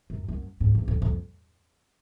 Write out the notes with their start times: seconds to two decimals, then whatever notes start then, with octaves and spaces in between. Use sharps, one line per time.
0.10 F#2
0.28 F#2
0.60 G#2
0.75 E2
0.88 F2
1.02 F2